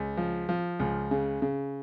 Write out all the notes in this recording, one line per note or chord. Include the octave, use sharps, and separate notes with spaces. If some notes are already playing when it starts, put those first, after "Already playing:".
Already playing: C#2
F3
F3
C#2
C#3
C#3